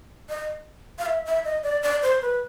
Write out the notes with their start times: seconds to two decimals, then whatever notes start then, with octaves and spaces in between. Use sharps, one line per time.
0.29 D#5
0.99 F5
1.06 E5
1.26 E5
1.45 D#5
1.63 D5
1.83 D5
2.02 C5
2.22 B4